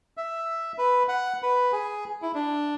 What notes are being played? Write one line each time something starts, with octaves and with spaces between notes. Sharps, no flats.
E5
B4
F#5
B4
G#4
E4
D4